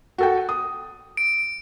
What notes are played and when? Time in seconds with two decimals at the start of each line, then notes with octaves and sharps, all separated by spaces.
0.18 F#4 A4 G5
0.49 D#6
1.17 D7